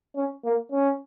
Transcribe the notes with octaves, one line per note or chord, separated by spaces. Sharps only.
C#4
A#3
C#4